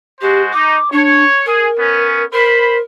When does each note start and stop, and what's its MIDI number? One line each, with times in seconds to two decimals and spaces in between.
0.21 0.51 56
0.21 0.51 66
0.21 0.41 67
0.21 0.51 72
0.53 0.77 63
0.53 0.89 86
0.92 1.24 62
0.92 1.42 73
1.46 1.66 68
1.46 2.25 70
1.78 2.21 59
1.78 2.21 61
2.32 2.79 70
2.32 2.76 72
2.32 2.76 83